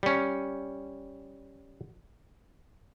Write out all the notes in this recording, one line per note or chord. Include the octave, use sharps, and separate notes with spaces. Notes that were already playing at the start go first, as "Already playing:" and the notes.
G3 C#4